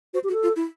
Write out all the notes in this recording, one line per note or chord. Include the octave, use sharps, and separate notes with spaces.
F#4 C5
G4
F#4
A4
F4
E4